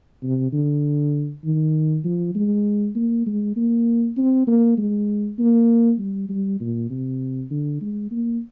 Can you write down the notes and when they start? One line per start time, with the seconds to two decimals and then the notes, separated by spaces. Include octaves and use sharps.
0.23 C3
0.53 D3
1.44 D#3
2.04 F3
2.35 G#3
2.96 A#3
3.26 G#3
3.56 A#3
4.17 C4
4.47 A#3
4.78 G#3
5.39 A#3
5.99 G3
6.29 G3
6.60 A#2
6.90 C3
7.50 D3
7.81 G#3
8.11 A#3